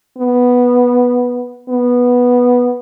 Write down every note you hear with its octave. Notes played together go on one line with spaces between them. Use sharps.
B3
B3